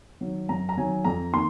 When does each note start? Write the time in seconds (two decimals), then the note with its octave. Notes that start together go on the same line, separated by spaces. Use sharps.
0.21 D#3 F#3
0.49 F#2 A#5
0.69 A#5
0.77 D#3 F#3 G#5
1.05 F2 A#5
1.33 D#3 A#3 C6